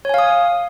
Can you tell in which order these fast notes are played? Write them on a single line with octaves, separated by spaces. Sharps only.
C#5 G#5 F5 D#6